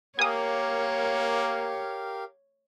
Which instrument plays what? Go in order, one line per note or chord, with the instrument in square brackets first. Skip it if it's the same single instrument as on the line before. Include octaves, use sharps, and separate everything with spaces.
[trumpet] A#3 [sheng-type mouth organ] G4 A#4 F5 [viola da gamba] C#5 [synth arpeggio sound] G#5 D#6